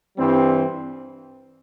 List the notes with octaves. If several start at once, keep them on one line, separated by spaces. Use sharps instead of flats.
G2 E3 G3 C4